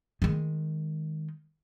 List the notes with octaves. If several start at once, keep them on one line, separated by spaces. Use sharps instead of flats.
D#3 G#3